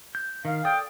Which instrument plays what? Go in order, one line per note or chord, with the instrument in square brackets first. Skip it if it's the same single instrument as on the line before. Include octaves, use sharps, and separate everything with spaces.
[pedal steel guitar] G6
[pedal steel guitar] D#3 [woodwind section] F5
[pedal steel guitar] A4 D5 D#6 [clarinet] G5